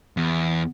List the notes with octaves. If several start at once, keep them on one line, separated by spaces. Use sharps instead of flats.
E2